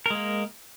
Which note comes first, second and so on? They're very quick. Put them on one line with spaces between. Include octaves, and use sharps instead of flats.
A#4 G#3 A#3